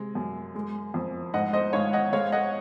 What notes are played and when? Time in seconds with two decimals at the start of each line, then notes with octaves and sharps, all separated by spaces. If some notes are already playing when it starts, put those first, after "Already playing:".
Already playing: C3 G#3
0.15 F#2
0.55 G#3
0.94 F2
1.34 G#2 D#5 F#5
1.53 C5 D#5
1.73 G#2 C#5 F5
1.93 D#5 F#5
2.13 G#3 C#5 F5
2.32 D#5 F#5